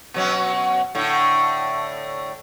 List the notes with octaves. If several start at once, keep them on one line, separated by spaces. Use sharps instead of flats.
B2 F#3 C#4
A2 D3